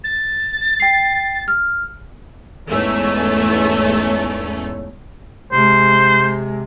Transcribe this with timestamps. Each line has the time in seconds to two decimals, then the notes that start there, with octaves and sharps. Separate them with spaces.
0.04 A6
0.80 G5 C7
1.48 F6
2.68 E2 G#2 A3 C#4
5.52 C3 G#3 C5